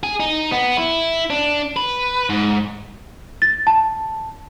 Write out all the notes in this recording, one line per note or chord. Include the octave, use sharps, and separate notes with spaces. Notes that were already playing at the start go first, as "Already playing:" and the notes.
G#4
D#4
B3
E4
D4
B4
G#2
A6
A5